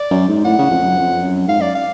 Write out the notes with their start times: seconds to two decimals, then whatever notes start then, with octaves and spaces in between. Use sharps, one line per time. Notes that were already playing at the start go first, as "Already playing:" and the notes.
Already playing: D5
0.11 F#2
0.29 G#2
0.45 A2 F#5
0.59 C#3
0.71 F2
0.83 F#2
0.98 F2
1.23 F#2
1.48 G#2 F5
1.59 F#2 D5
1.75 F5